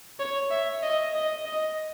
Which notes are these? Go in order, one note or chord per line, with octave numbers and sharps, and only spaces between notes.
C#5
E5
D#5
D#5
D#5